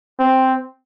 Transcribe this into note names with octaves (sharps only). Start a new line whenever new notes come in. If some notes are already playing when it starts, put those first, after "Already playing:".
C4